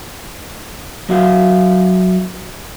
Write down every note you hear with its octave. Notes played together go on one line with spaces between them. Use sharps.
F#3 F#4 E5 F5